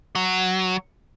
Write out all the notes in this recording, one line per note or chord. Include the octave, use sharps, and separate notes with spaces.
F#3